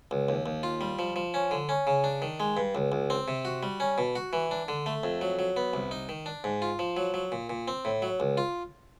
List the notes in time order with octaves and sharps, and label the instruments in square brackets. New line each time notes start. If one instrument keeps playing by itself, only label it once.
[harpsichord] C#2
D#2
D#2
F4
G3
F3
F3
C#4
D3
C#4
C#3
D4
D#3
G#3
G2
C#2
C#2
C4
C3
F#4
G3
C#4
B2
F#4
E3
D4
D3
A3
F2
F#3
F#3
B3
C2
D#4
D#3
D4
G#2
F4
F3
F#3
F#3
A#2
A#2
C4
A2
F#3
C#2
F4